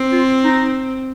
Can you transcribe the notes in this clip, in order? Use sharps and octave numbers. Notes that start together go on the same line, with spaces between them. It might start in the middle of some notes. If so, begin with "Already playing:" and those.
Already playing: C4
F4
D#4